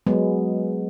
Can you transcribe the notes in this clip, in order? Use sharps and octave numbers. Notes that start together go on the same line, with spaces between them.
F#3 G#3 B3